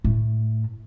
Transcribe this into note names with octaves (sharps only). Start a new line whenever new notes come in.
A2